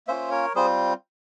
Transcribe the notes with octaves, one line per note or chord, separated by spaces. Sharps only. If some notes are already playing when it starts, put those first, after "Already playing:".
A#3 C#4 F4 C5 E5
A#4 C#5
G3 C4 F4 G#4 C5